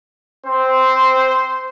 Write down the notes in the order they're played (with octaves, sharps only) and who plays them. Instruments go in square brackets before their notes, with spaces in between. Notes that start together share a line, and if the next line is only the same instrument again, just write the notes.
[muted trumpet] C4 [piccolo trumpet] C5